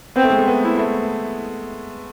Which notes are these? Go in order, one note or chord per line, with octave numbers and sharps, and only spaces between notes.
B3 C4
A3
G#3
A3
B3
E4
A3